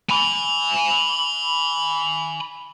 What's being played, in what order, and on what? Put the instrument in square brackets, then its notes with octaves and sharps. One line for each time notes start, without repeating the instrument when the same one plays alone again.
[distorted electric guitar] G#5 B5